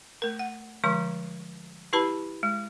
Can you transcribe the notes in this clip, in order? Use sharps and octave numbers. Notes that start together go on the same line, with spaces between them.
A3 A#4
F#5
D3 F3 G#3 C#6
E4 G4 B4 A5 B5
G#3